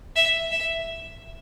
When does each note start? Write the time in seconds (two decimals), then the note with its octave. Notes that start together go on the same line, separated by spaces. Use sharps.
0.16 E5
0.51 E5